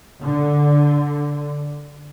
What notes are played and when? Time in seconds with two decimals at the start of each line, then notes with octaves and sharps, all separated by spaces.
0.22 D3